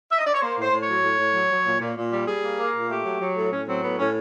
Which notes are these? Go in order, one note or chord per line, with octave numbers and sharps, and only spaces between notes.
E5
D#5
D5
C#5
A#3 C5
A2
C5
A2
F#3 C#5
A2
A2
F#3
F#3
A#2
A#2
A#2
G3
G3 G#4
A#3
A#3
A#2
A3 G4
F#3
F#3
A2
A2 C#4
F#3 C4
A2 B3
A2 C#4